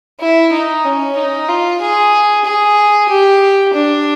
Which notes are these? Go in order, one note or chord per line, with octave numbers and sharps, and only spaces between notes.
E4
D#4
C#4
D#4
F4
G#4
G#4
G4
D4